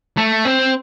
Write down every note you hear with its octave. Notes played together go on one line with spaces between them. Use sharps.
A3
C4